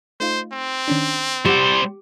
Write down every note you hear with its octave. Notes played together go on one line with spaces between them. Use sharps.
A3 D#4 F4 C5
C4
D#3 C#4 D4
G3 G4 C5 F#5 C7